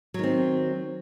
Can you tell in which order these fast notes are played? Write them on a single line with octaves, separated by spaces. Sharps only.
F#3 D#3 C4